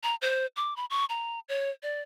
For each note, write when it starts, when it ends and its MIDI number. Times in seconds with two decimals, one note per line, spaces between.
0.03 0.15 82
0.22 0.46 72
0.56 0.74 86
0.77 0.85 83
0.90 1.05 85
1.09 1.40 82
1.49 1.70 73
1.83 2.02 74